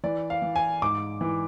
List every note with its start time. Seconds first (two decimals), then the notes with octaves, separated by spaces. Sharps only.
0.04 E3 D5
0.30 F5
0.42 E3
0.56 G#5
0.82 G#2 D6
1.21 E3